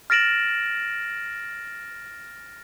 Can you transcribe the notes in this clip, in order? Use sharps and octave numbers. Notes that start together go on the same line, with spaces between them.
F6 A6 A#6 D7 E7 F#7